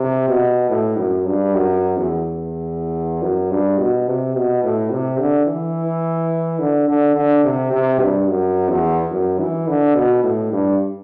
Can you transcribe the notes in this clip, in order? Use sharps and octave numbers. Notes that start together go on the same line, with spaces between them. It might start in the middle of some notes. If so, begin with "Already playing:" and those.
Already playing: C3
B2
A2
F#2
G2
F#2
E2
F#2
G2
B2
C3
B2
A2
C3
D3
E3
D3
D3
D3
C3
C3
G2
F#2
E2
F#2
E3
D3
B2
A2
G2